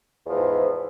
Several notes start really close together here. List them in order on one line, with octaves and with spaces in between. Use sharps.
E2 F3 E3 G#2